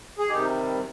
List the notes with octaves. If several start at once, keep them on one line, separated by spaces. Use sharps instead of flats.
G#4
C3 D#3 G3 D#4 G4